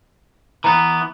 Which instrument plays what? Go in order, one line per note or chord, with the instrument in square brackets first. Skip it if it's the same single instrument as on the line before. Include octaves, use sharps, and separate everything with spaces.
[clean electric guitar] E3 B3 [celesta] A#5